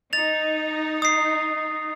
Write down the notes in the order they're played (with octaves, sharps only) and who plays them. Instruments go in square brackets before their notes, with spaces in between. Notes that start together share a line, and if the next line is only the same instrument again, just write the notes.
[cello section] D#4 [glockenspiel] A6 F7
[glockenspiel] D#6 C7